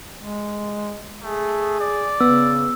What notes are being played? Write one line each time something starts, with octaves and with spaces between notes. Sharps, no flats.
G#3
A3 G#4
D5
C#3 B3 E6